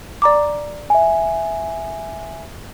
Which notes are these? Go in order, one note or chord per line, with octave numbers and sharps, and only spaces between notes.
D5 A#5 D6
E5 G#5